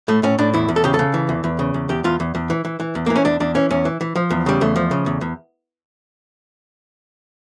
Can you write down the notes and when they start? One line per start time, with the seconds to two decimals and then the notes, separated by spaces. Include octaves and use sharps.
0.08 A2 A3
0.23 A2 C#4
0.39 A2 D4
0.54 E2 E4
0.69 E2
0.76 A4
0.84 C#3 G4
0.94 A4
0.99 C#3
1.14 E3
1.29 E2
1.44 E2
1.59 C#3
1.74 E2
1.89 E2 G4
2.04 E2 F4
2.20 E2
2.35 E2
2.50 E3
2.65 E3
2.80 E3
2.95 E2
3.06 E3 A#3
3.16 C#4
3.25 E2 D4
3.40 E2 D4
3.55 E3 C#4
3.70 E2 C#4
3.85 E3
4.01 E3
4.16 F3
4.30 E2
4.46 C#3 G3
4.61 E2 A3
4.76 F3
4.91 C#3
5.06 E2
5.21 E2